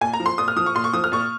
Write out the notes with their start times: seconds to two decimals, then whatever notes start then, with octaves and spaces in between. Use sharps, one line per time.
0.01 A#2 G#5
0.14 A#5
0.20 F3
0.26 C6
0.38 A#2 D#6
0.48 F6
0.56 F3 D#6
0.66 C#6
0.75 A#2 C6
0.84 C#6
0.93 F3 D#6
1.04 F6
1.12 A#2 C#6